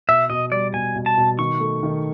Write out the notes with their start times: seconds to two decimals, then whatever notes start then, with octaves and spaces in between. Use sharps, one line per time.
0.08 B2 E5
0.30 B2 D#5
0.52 G3 D5
0.73 B2 G#5
0.96 B2
1.06 A5
1.17 B2
1.38 D#3 C#6
1.60 A3
1.83 D#3